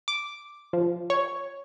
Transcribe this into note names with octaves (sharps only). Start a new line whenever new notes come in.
D6
F3
C#5